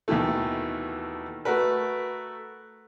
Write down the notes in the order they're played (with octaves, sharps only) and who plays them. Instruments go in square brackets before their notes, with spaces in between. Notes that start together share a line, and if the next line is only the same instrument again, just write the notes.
[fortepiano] D#2 B2 D#3 E3 A3
A3 F#4 A#4 B4